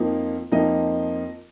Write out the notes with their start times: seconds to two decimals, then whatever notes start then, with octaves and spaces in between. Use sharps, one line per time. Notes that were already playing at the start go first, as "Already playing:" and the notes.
Already playing: F2 F3 A#3 D#4
0.52 F2 F3 A#3 D#4 D#5